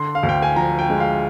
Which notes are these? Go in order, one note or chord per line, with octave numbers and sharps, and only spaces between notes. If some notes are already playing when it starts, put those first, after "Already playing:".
Already playing: D3 C6
F5
D2
G5
G#5
F3 A#5
G5
G#3
F5